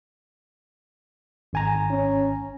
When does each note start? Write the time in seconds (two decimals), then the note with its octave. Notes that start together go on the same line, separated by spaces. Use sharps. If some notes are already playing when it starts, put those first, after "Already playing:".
1.53 G#1 G#5 A#5
1.90 C#4